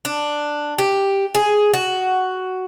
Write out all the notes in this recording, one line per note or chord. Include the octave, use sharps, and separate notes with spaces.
D4
G4
G#4
F#4